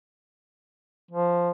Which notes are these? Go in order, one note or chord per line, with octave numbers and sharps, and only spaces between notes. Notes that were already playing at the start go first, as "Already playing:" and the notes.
F3